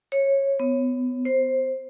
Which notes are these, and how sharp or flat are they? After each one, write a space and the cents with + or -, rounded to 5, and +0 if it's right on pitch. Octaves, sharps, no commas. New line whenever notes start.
C#5 -15
B3 +25
C5 +10